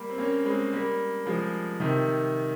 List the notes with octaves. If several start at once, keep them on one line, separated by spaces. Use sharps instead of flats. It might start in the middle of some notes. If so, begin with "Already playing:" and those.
Already playing: G3 A#3
C4
A#3 C#4
G#3 C4
G3 A#3
F3 G#3
C3 D#3